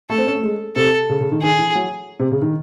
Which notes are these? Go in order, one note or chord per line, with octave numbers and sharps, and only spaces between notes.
A3 A4
C4
C#4
A3
G#3
C3 A4
C#3
C#3
D#3
D#3 G#4
E3
F#3
C3
C#3
D#3